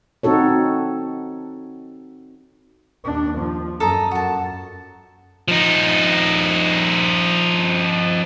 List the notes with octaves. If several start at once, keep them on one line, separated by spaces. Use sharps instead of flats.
C4 D#4 F#4 A4 C#5
D#2 D4
F3
F#2 A4 D#5 A#5
F#2 F#4 A5
F3 D#4